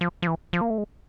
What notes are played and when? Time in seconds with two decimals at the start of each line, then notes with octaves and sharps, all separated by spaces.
0.01 F3
0.22 F3
0.27 E3
0.53 F3
0.61 A#3
0.70 A3
0.78 G#3